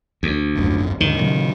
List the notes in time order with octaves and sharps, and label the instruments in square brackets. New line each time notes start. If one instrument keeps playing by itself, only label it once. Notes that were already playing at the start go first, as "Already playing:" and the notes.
[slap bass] D2
[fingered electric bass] D#1 G#1 F#2
[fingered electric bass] D#2 G#2 D3 [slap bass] D#3
[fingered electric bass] A#2 C#3 F#3